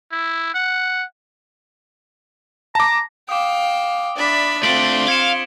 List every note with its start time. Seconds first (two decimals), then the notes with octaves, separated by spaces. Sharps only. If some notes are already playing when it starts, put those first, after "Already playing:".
0.12 E4
0.54 F#5
2.75 A5 A#5 D6
3.29 F5 G5 D6 D#6
4.16 D4 D5 E5 B5
4.63 A3 C4 D4 F4 C6 B6 D7 F#7
5.08 F5 G#6 C#7 E7